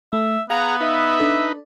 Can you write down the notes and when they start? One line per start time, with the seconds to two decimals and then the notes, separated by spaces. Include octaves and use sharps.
0.13 A3 E5
0.50 B3 G#4 F5 F#5 A#5
0.81 D#4 B4 E5
1.19 D4 A4